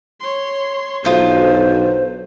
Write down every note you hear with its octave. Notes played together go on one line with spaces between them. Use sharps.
C#5 C6
B1 D3 F#3 F4 C5 D#6